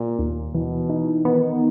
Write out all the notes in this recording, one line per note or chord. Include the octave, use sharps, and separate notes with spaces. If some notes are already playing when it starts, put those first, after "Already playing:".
Already playing: A#2
D#2
B2 E3
D#4
D#3 B3